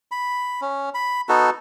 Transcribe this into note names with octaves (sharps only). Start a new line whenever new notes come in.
B5
C#4
B5
B3 D#4 F#4 A4